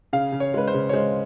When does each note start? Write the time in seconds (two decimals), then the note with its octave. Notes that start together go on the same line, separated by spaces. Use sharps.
0.13 C#3 F5
0.32 C#3
0.40 C#5
0.54 G#3 B4
0.68 C5
0.74 C#3
0.89 C#5
0.94 G#3 C5